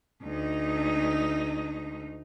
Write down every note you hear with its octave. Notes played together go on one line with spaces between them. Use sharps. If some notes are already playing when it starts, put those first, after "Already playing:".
D2 D#4